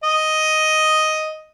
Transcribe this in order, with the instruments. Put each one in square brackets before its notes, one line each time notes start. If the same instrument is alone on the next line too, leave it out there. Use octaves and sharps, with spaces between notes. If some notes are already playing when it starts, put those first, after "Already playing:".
[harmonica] D#5